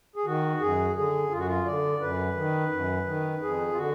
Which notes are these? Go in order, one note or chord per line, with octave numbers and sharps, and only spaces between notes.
G#4
D#3 F#4
F#2 G#4
D3 G#4
F#2 F4
F#4
F4
D3 D5
F#2 B4
D#3
F#2
D#3
F2 G#4
F4
D3 F#4